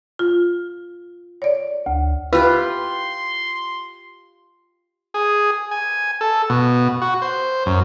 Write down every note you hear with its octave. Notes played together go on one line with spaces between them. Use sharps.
F4
C#5 D5
D2
F4 G4 B4 C6
G#4
G#5
A4
B2
F#4
C5
F#2